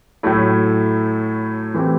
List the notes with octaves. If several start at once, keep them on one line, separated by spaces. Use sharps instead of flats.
A2 F#3 A3 E4
E3 A3 C4 G4